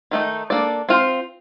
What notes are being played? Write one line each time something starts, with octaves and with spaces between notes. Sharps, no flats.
D#3 A3 D#4
A#3 D4 A4 D5
C4 F4 C5